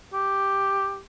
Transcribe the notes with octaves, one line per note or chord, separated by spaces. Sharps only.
G4